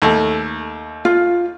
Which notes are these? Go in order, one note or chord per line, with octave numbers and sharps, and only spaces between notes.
D#2 A3
F4